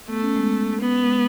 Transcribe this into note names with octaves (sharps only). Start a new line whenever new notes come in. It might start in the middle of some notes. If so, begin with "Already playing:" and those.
A3 B3
C#4
G#3 B3
B3
G#3